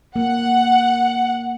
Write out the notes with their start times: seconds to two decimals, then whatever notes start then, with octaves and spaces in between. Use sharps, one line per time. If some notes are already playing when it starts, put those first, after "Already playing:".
0.16 A#3 F#5